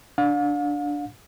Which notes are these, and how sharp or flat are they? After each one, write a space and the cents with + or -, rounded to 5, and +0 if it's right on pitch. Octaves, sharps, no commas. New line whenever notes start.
D4 +0 F5 +40